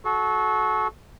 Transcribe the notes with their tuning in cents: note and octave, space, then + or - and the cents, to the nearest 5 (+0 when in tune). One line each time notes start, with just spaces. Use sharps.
F#4 -5 A4 -30